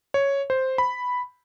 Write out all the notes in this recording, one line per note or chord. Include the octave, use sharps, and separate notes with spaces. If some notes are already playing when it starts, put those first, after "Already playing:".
C#5
C5
B5